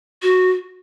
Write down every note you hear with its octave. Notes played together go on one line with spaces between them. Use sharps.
F#4